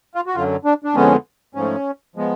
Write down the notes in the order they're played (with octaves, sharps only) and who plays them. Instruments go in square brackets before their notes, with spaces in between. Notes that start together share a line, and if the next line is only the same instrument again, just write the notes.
[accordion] F4
F#4
F#2 D3 F#3 F4
D4
D4
F2 D3 G#3 B3 C#4
G#2 F3 A3 C#4
F3 G#3 B3